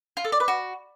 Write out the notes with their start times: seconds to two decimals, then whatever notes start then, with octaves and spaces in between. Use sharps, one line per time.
0.17 F4
0.25 A4
0.32 D5
0.40 B4
0.48 F#4